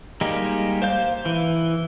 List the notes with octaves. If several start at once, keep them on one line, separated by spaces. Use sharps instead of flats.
G3 G#3 A#3 D#4 G4
C5 F5 G6
E3